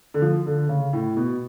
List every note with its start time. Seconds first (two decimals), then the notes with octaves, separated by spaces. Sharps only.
0.14 D3
0.22 F3
0.46 D3
0.69 C#3
0.93 A2
1.17 B2